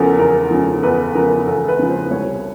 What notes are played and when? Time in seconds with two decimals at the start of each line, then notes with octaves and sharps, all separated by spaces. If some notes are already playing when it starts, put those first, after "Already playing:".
Already playing: E2 C#3 F3 A4 A#4
0.19 E2 A#4
0.51 C#3 F3
0.83 E2 B4
1.15 C#3 F3 A#4
1.47 E2 A4
1.68 B4
1.79 C#3 F3
1.90 C5
2.11 C2 C#5